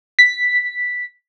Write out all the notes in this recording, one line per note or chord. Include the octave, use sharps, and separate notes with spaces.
B6